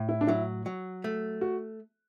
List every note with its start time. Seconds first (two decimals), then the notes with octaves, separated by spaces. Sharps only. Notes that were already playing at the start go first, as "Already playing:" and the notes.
Already playing: A2
0.09 E4
0.21 D4
0.27 F#3 E4
0.66 F#3
1.04 A3
1.41 F#4